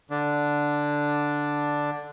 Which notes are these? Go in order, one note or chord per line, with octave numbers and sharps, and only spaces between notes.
D3 D4